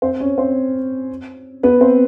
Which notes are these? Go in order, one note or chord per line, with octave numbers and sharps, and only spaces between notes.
C4 C5
C#4 C#5
C4 C5
B3 B4
C4 C5